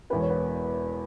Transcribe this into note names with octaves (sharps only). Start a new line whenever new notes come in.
E1 E2 E3 B3 B4
C#5
B3 B4